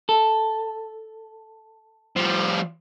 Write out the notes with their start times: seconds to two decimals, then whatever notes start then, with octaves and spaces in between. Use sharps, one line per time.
0.09 A4
2.16 F3 G3